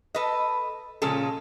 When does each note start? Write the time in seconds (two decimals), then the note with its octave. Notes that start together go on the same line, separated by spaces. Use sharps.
0.15 A4 B4 D#5
1.02 A#2 C#3 F3 G#3 C#4 A4